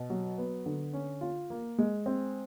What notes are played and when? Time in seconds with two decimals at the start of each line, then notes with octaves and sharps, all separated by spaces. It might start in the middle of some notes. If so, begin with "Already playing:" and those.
Already playing: B2
0.10 F#3
0.38 B3
0.66 D3
0.93 C#4
1.21 F4
1.50 A#3
1.78 G#3
2.06 C4